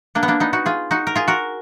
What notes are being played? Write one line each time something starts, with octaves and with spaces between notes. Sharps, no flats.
A#3 D4
B3
A#3 D4
B3 D#4
D#4 F#4
F4 G#4
D#4 F#4
A#4
F4 G#4
F#4 A#4